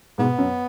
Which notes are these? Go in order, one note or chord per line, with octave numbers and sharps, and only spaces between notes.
G#2 B2 B3
F#2